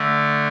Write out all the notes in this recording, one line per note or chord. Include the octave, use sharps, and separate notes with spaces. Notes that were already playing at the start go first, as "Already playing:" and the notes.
Already playing: D3 A3